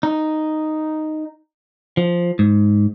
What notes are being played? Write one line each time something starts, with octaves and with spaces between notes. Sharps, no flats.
D#4
F3
G#2